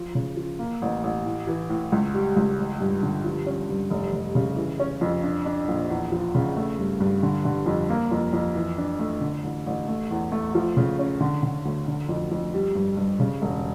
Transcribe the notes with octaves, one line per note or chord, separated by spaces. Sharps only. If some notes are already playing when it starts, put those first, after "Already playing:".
Already playing: F3
C#3
F3
A#3
A1
A1
A2
E3
A2
C#2
G3
C#2
A1
G2
D3
F3
C#4
G2
F1
F1
C#3
E3
C#4
F2
D4
D4
A#1
E2
F3
C#3
A3
G2
G2
D3
D3
F2
A#3
F2
F2
E3
D4
A3
D3
A1
A1
A3
E2
A3
F3
C#3
C#4
D3
D3
D2
D3
F2
F2
G3
G2
G2
C#3
E1